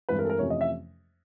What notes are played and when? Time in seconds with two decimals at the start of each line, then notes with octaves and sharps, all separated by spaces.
0.09 G2 E3 G#3 C4 B4
0.19 A#4
0.25 A4
0.30 A#4
0.39 F2 C3 E3 A3 C#4 C#5
0.50 D#5
0.61 E5